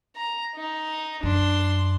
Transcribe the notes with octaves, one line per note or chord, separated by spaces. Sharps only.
A#5
D#4
F#2 D4 C6